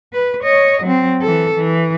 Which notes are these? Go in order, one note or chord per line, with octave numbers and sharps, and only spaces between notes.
B4
C#5 D#5
F#3 C4
E3 A4
E3